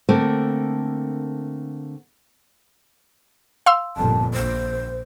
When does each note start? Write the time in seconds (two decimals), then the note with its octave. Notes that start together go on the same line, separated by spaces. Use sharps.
0.09 D3 A3 A#3 C4 A#4
3.66 F5 C6 E6
3.97 G1 F2 A#2 A5
4.34 A#1 C5